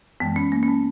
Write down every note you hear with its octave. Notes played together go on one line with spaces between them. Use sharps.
F#2 E3 G#3 B3
C#4
A#3
C#4
B3